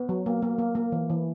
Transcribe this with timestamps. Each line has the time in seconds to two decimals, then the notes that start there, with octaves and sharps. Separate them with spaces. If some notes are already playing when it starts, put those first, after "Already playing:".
Already playing: B3
0.09 F#3
0.26 A#3
0.42 A#3
0.58 A#3
0.75 A#3
0.92 E3
1.10 E3